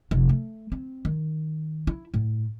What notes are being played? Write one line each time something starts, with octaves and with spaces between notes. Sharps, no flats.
F1
A3
C4
D#3
E4
A2